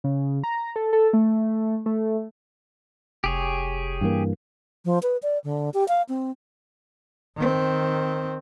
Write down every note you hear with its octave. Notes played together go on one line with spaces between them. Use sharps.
C#3
A#5
A4
A4
A3
A3
F1 G4 G#4 C#5
G2 E3 A#3
F3
B4
D5
D3
G4
F5
C4
D#3 C4